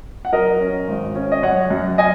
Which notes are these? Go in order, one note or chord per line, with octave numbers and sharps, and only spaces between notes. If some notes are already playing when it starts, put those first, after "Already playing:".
F#5
F#3 A#4 D#5
C#4
G#1
C#4
D#5
F#2 C#5 F#5
F#2
D#5 G#5